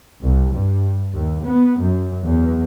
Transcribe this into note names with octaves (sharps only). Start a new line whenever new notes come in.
C2
G2
D#2
B3
F#2
E2